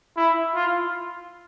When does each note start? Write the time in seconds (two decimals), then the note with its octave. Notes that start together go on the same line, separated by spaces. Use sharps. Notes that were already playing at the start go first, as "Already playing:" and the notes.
0.17 E4
0.55 F4